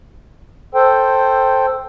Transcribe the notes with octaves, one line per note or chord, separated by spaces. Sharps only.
A4 C5 G5